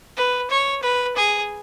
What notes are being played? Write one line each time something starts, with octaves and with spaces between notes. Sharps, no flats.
B4
C#5
B4
G#4